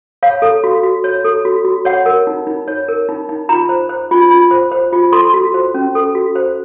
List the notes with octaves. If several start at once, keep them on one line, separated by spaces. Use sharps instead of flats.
C#5 F5
A4
F#4
F#4
C#5
A4
F#4
F#4
C#5 F#5
A#4
D#4
D#4
C#5
A#4
D#4
D#4
F4 A#5
C5
C5
F4
F4
C5
C5
F4
A4 C6
F#4
C5
C#4
A4
F#4
C5